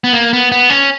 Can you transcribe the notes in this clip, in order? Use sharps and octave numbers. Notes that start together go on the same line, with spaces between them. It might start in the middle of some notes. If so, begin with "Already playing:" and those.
B3
A#3
B3
B3
C#4